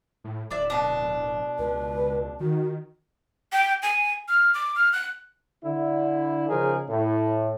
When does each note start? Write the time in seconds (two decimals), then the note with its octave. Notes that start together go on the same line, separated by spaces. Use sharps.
0.24 A2
0.51 D1 D4 D5 E5
0.70 B2 D4
1.59 C#2 B4
2.40 D#3 F#4
3.52 G5
3.82 G#5
4.28 F6
4.54 D6
4.76 F6
4.93 F#6
5.65 D3 E4
6.49 C#3 F3 D#4 G#4 A#4
6.89 A2